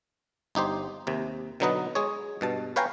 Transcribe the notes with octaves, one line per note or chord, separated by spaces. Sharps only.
G1 D#4 G4 C5
D#2 C3
B2 D3 F#3 D#4 B4 D#5
G#3 G#4 C#5
G2 B2 A5
B4 C#5 F5 G5 G#5 A#5